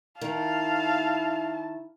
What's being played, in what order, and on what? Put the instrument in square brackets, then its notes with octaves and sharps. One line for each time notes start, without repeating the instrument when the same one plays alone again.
[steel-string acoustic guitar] D#3 [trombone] E4 [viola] F5 [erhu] A5